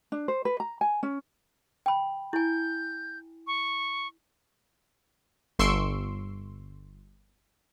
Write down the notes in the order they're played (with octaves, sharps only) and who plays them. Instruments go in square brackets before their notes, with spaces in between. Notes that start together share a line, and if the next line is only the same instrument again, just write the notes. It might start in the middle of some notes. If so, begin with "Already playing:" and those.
[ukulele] D4
C5
B4
A#5
G#5
C#4
[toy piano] G5 B5
[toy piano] E4 G#5 [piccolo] G6
[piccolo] C#6
[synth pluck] G1 C6 C#6 E6 C7 D7